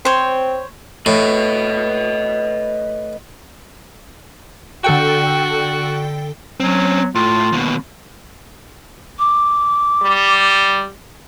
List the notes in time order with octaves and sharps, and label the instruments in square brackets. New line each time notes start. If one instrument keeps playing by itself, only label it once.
[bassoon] C4 [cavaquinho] C5 C#5
[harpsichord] A2 [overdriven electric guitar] B4 D#5
[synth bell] D3 A4 G5 [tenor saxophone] F#4
[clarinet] F#3 [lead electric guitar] C4 C#4
[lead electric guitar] A2 [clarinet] F4
[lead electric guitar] D#2 B2
[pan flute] D6
[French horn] G3